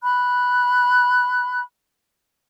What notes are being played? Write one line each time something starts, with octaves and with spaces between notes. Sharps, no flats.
B5 F#6